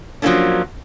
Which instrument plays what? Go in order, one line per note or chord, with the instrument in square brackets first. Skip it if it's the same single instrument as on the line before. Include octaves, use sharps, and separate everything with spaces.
[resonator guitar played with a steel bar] F3 F#3 G#3 A#3 C#4 D4